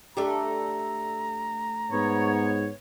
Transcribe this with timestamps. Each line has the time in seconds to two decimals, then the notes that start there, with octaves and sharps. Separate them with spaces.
0.17 A3 D4 G4 A#5
1.91 G#2 B3 C#5